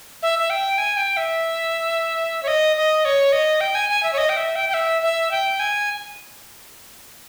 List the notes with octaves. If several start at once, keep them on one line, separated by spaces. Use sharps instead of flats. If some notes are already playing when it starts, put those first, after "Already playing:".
E5
E5
G5
G#5
G5
E5
C#5
D#5
D#5
C#5
D#5
G5
G#5
G#5
E5
C#5
D#5
G5
E5
G5
G5
E5
E5
G5
G#5